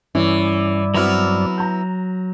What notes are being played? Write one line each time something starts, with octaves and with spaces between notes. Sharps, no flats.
G2 E3 C#4 E4 D5
F#3 B3 C4 E4 F#4 F6
A#5 G6